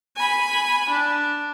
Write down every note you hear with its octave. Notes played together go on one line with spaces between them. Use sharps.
G#5 B5
D4